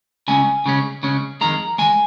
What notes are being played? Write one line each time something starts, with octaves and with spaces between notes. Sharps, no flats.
C#3 G#3 C#4 G#5
C#3 G#3 C#4
C#3 G#3 C#4
F2 D#3 G#3 A#5
D#3 G#3 G#5